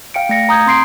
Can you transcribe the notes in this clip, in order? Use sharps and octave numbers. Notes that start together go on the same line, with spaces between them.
F5 G5 C#7 D7
A3 F5 A#6 C#7
A#5 D#6 G6 G#6
C4 C6 C7 D7